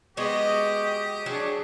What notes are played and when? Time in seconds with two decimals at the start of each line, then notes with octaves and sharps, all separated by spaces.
0.17 G#3 B3 F#4 G4 D#5
0.85 D#5
1.26 F#3 D4 G#4